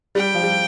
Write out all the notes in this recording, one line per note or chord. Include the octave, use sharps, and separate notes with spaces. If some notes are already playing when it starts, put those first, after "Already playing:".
G3 G5
F3
G3